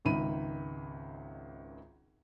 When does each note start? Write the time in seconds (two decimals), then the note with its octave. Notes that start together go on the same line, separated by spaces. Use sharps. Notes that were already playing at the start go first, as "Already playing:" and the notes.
0.05 G#1 C#2 D#3 E5 B5 D#7